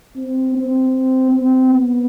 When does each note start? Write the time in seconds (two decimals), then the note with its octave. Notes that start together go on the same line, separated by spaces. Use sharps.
0.16 C4
0.55 C4
1.31 C4
1.69 B3